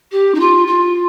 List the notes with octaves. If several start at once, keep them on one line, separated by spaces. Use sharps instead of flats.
G4
D#4
F4
F4